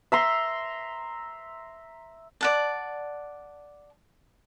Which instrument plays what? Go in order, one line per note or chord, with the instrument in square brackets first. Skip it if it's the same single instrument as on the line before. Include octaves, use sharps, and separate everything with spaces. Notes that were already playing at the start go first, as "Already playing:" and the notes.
[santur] E5 A#5 C6
[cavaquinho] D5 F#5 A5